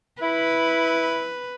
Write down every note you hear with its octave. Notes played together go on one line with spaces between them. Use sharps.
E4 B4